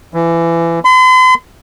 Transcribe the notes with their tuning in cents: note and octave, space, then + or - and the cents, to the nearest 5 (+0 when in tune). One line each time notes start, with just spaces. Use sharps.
E3 +25
C6 -45